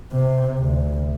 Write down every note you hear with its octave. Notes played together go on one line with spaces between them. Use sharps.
C3
D2